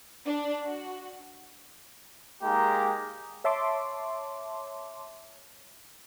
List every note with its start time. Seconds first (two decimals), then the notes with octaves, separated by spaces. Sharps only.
0.25 D4
0.66 F#4
2.42 G#3 A#3 D#4 G4 A#5
3.44 C#5 E5 A5 C6 D6